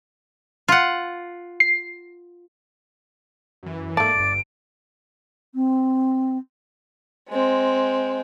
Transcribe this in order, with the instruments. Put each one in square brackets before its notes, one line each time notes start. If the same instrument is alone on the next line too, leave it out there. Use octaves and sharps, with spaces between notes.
[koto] F4 F#5
[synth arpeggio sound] C7
[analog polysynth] F#2 E3
[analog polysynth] G#2 A#3 [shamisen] A3 A5 [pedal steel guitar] D5 [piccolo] D7
[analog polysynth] G1 G2
[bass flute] C4
[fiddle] G#3 C4